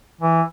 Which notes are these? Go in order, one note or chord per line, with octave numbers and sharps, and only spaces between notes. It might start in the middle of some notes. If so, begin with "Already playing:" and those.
E3